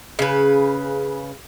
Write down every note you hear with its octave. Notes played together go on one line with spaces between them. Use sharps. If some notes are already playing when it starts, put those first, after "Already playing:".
C#3 B4